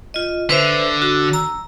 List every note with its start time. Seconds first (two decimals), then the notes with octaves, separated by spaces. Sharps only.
0.14 F4 D#5
0.49 D3 B4 C5 E5
1.02 F#4
1.33 A#5 E6